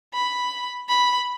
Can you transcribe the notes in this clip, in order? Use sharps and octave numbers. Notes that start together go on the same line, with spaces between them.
B5
B5